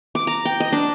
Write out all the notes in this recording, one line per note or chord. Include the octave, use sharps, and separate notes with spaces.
D6
A#5
G5
D#5
D4